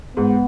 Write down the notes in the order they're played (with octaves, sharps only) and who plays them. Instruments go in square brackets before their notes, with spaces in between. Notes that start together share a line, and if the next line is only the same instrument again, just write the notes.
[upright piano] G#2 [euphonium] B3